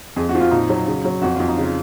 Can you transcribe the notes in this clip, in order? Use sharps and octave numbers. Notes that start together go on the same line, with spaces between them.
F2 G#4
F#4
F3
F4
A#2 D#4
F#3
C#3
F#3
F2 F#4
F2 F4
D#4
C#3 F4